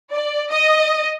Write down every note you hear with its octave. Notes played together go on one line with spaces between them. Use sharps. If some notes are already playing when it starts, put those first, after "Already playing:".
D5
D#5